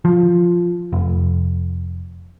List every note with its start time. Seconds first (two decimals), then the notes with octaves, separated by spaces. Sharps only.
0.05 F3
0.93 F1